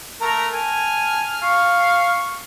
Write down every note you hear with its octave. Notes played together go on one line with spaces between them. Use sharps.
A3 A#4 A#5
G#5 A5 F6
F5 C#6